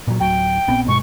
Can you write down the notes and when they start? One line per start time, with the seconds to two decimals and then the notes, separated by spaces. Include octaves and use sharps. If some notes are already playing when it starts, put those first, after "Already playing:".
0.07 A#2 F#3
0.20 D1 F#3 G5
0.68 A#1 B3 C4
0.88 G2 B2 G#3 C#6